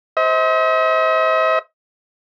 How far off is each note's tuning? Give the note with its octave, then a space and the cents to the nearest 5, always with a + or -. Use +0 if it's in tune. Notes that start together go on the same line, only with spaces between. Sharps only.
C5 +0 D#5 +45